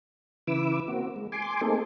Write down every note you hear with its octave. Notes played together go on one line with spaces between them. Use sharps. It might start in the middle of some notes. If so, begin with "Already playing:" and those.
C#3 E3 E4 B4 D6 E6
A#3 C4 F#4
G#3
G#5 C6 D6
A3 A#3 C4 D#4 G#4 A4